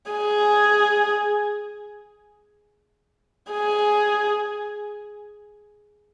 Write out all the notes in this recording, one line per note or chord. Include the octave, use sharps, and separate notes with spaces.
G#4
G#4